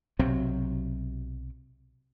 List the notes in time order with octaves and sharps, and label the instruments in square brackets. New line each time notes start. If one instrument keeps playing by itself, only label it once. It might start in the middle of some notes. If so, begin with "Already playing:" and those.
[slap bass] B1 C3 F#3 C4